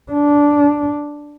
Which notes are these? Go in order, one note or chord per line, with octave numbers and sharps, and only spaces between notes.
D4